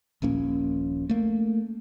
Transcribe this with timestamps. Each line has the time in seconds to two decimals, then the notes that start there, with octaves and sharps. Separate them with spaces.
0.22 D#1 A#1 A#3 C#4
1.09 A3 A#3